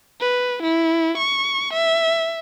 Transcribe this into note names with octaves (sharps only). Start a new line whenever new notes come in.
B4
E4
C#6
E5